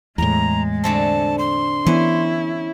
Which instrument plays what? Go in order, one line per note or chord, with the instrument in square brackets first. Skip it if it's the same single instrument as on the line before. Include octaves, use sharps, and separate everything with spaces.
[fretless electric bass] E2 A2 [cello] G#3 [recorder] A#5
[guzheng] D3 A3 C4 [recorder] A5
[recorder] C6
[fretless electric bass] E3 B3 [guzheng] C#4 [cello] E4